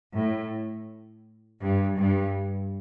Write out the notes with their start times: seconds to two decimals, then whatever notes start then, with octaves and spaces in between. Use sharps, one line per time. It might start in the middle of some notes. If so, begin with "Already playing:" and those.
0.15 A2
1.63 G2
2.00 G2